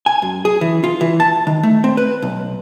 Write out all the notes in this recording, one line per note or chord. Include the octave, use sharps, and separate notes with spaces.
G#5
F#2
G#4
E3
F4
E3
A5
D#3
A3
C4
B4
B1